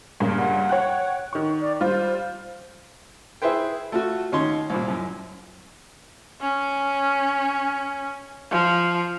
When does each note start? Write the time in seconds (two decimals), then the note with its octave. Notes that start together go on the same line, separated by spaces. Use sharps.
0.20 G2 A#2 C#3
0.38 F#5
0.69 C#5 G5 F#6
1.33 D#3 C#6
1.61 D5
1.81 G3 F4 C5
3.42 E4 G#4 B4 C5 G5
3.92 A3 F4 F#4
4.32 D#2 C#4 D#4 C6
4.70 C2 A#2
4.88 F#2
6.41 C#4
8.51 F3